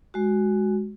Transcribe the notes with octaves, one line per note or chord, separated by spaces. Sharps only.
G#3 F#4